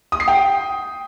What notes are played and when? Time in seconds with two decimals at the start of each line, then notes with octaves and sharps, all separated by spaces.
0.12 D#6
0.20 C7
0.28 G5